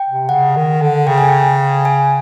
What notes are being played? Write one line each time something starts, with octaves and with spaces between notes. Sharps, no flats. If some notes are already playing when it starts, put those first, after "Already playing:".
Already playing: G5
C3
C#3 F#5
D#3
D3
C#3 G5
G#5
G5
G#5